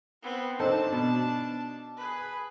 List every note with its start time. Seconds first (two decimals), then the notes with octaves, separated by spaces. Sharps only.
0.22 B3 C4
0.60 C4 D4 D#4 A4 A5
0.92 B2
1.97 G#4 B4